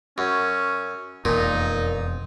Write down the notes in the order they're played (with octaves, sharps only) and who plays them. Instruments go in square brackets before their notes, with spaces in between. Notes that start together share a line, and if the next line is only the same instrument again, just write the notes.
[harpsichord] F#2 [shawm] C#4
[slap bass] E1 F2 [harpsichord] A#2 [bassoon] A#3 [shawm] D#4